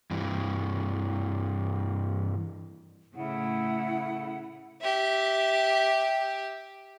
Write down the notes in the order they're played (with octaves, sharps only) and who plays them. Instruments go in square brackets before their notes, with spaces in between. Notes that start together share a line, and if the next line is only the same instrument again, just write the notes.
[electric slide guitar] G2 E3
[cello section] A2 C#3 A3 [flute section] E4 F#5
[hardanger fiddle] G4 E5